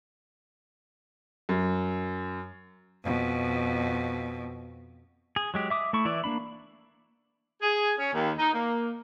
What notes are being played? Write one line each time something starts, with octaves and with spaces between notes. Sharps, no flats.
F#2
F2 B2
G#4
F#3 G#3 G4
E5 D6 D#6
A3 E4 C#6
E3 E4 D5
A#3 D4 B5
G#4
C#4
D#2
D#4
A#3